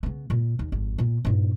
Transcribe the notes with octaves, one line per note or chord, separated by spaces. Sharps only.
C#3 B3
A#2 A#3
D#2
G#1 F2
A#2 B3
G2 A#2